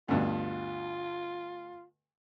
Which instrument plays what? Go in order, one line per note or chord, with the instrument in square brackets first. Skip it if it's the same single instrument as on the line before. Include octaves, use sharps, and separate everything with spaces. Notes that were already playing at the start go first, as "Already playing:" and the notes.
[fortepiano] D2 G2 B2 [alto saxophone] F4